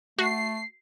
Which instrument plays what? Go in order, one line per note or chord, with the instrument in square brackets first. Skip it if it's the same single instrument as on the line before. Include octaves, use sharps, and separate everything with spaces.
[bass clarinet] A3 [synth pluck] F#4 [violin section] C7